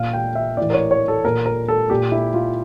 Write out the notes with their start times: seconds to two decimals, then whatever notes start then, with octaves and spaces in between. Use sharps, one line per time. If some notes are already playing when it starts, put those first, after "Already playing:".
Already playing: A#2 F5
0.13 G5
0.35 E5
0.57 A2 E3 D5
0.70 A#4
0.74 C#5
0.91 C#5
1.08 A4
1.25 A#2 A#4
1.46 A#4
1.68 A4
1.90 A#2 G4
2.12 E4
2.34 F4